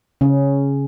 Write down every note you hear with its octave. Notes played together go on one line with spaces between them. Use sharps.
C#3 C#4